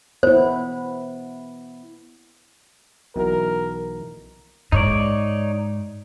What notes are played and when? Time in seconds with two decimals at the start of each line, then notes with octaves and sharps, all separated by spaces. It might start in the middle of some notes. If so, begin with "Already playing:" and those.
0.23 B3 E4 C5
3.16 B1 B2 E3 A#4
4.72 G#2 D#4 C#5 D5